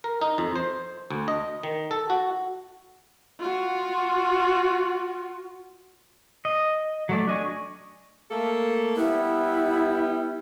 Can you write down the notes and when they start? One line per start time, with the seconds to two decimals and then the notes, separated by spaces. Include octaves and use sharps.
0.04 A#4
0.21 D#4
0.38 F2
0.56 C5
1.11 D2
1.28 D#5
1.63 D#3
1.91 A4
2.10 F#4
3.39 F4 F#4
6.45 D#5
7.09 F#3 A3 D5
7.27 D4 D#5 G#5 C#6
8.31 A3 A#3 A4
8.96 G3 B3 E4